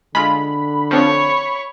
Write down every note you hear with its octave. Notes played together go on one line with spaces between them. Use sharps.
D3 G#3 F4 B5
F3 C4 D4 C#5 C#6